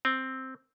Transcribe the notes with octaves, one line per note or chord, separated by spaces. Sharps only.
C4